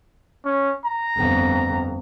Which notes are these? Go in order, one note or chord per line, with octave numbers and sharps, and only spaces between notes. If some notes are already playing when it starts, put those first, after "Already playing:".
C#4
A#5
G1 F2